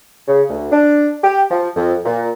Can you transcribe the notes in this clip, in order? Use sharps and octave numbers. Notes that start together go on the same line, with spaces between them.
C#3
D2
D4
G4
F3
F2
A#2